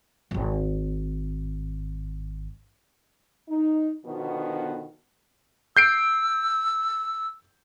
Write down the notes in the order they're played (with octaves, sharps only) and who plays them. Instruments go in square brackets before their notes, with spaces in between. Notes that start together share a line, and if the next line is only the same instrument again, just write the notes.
[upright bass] D1 G#1
[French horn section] D#4
B2 D3 D#3 F3 B3 F#4
[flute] E6 [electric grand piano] G6 C7 D7